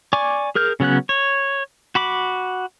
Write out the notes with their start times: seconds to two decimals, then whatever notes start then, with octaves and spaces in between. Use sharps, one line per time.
0.13 D5 G#5 C#6 D6
0.55 G#4 A#4 F6 G6
0.80 C#3 F#3 B3 C#4 F#6
1.09 C#5
1.95 F#4 B5 D6